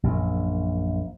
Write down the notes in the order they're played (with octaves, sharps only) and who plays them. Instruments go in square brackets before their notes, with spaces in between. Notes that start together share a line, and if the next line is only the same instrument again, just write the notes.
[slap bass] A#1 F#2